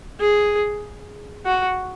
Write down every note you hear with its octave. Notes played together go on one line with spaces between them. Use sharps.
G#4
F#4